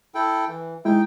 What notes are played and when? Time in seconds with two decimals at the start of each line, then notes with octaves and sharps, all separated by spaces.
0.15 E4 A4 G5
0.49 E3
0.85 G#3 D#4 E4 G5